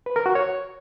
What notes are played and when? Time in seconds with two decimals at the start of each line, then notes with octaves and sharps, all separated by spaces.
0.06 B4
0.16 A#4
0.26 F#4
0.35 C#5